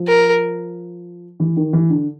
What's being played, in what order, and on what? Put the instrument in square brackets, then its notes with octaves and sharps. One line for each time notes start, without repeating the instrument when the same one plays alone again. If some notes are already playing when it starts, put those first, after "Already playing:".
Already playing: [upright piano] F3
[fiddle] A#4
[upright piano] E3
D#3
E3
D3